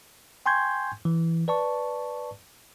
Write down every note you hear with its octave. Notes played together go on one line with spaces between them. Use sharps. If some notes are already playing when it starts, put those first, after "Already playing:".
G5 G#5 C6 C#6 G6 G#6
E3
B4 D5 A5 C#6